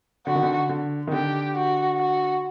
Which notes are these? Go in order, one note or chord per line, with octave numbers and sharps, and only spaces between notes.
D3 F#4
D#3
D3
D3
D#3
D3 G4
F#4
F#4